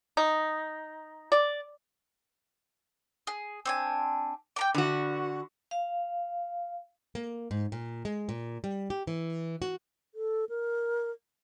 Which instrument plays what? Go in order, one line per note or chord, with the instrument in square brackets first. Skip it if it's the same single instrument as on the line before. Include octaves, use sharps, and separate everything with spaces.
[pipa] D#4
D5
[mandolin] G#4
C4 D4 G#5
G5 A#5 D6
[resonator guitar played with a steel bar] D3 F#4 [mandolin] B4
[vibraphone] F5
[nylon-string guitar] A#3
G#2
A#2
G#3
A#2
G3
G4
E3
F#4
[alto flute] A4
A#4